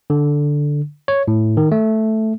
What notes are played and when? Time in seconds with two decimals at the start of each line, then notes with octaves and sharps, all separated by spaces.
0.10 D3
1.08 C#5
1.28 A2
1.57 D#3
1.72 A3